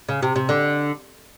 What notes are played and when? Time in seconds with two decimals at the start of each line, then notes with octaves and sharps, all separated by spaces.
0.09 C#3
0.22 C3
0.36 C3
0.49 D3